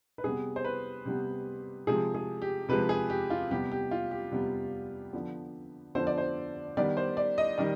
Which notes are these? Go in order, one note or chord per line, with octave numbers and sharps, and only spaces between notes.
B4
C3 G3 B3 G#4
C5
B4
C3 G3 B3
C3 F3 G#3 G#4
G#4
G4
C3 F3 G#3 B4
G#4
G4
F4
C3 G3 B3 G4
G4
F4
G4
C3 G3 B3
D3 F3 B3
D3 F3 B3 C5
D5
C5
D#3 G3 B3 D5
C5
D5
D#5
D#3 G3 D5